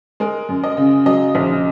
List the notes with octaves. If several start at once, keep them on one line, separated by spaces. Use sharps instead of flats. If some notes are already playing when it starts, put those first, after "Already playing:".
G#3 A#4
F#2
D#5
C#3
F#3 D#5
A#1